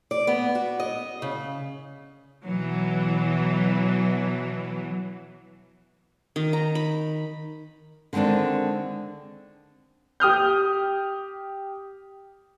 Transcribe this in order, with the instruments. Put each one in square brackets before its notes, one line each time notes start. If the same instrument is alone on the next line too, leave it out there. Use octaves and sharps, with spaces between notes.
[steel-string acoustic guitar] D5
B3
F#4
D#5
C#3
[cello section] B2 E3 F#3
[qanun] D#3
A#5
B5
[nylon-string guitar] D3 D#3 G#3 C4 D4
[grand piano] G4 D#6 F6 G6